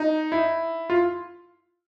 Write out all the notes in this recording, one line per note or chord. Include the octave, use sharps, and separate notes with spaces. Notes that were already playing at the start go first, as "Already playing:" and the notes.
Already playing: D#4
E4
F4